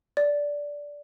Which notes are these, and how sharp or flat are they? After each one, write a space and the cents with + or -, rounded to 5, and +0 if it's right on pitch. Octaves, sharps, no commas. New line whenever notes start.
D5 -10